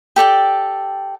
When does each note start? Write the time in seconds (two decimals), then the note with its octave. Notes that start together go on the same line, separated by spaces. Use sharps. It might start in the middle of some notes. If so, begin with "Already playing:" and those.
0.16 G4 A4 D5 G5